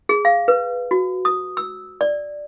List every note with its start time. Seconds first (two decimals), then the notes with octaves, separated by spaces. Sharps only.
0.09 G#4
0.25 F5
0.48 B4
0.91 F#4
1.25 D#6
1.57 E6
2.01 D5